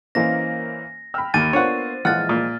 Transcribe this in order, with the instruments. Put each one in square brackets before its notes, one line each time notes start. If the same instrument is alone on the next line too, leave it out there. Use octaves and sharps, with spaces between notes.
[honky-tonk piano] E3 A#3 C#4 [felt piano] C5 D#5 F5 [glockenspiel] A#6
[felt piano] G5 E6 [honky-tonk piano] B5 F6
[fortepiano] D#2 [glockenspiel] A6 D#7
[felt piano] A#3 B3 A#4 [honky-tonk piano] D4 F4 C5 [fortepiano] C#5 F#5
[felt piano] A#1 G#3 [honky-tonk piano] E3 F3 F4 [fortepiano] F#5 [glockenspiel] F6 A6
[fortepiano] A#2